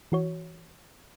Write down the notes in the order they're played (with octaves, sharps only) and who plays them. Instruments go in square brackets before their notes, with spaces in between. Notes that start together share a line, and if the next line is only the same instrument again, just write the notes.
[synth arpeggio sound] E3 F#4 C#5